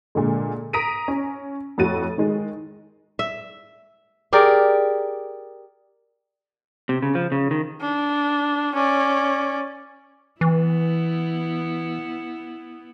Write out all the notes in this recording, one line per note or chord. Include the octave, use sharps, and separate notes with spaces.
A#2 D3 G#3
A#5 D#6 A#6 B6 D7 D#7
C#4
F2 A2 F#4 A6 D#7
D#3 G#3
E5
G4 G#4 A#4 D5
C3
C#3
F3
C#3
D#3
D4
C#4 D5
E3 B3 E4